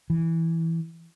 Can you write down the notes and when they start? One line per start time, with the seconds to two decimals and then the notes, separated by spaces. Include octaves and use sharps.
0.10 E3